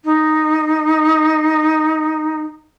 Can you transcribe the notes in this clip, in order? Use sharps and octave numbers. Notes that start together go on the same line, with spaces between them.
D#4